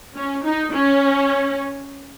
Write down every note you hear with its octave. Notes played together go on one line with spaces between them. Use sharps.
C#4
D#4
C#4